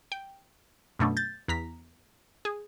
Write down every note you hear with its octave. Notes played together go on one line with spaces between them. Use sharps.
G5
F#2 B2 A3 D4
G6 A6
E2 A#5 B6
G#4